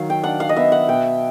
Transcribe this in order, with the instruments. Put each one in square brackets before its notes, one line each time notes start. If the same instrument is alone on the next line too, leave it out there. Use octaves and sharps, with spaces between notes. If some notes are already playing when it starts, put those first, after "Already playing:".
Already playing: [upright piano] D#3 F#3 [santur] F5
[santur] G5
[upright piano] D4 [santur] F#5
[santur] F5
D#5
[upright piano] B3 [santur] E5
[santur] F#5
[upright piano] B2 [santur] G5